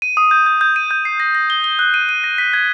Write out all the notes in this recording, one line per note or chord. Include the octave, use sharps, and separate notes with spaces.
D#7
D#6
G6
G6
G6
D#7
G6
C7
A#6
A#6
G7
G7
F#6
D#7
D#7
A#6
B6
G#6